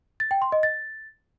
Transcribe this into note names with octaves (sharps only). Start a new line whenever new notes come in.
A6
G5
C6
D#5
A6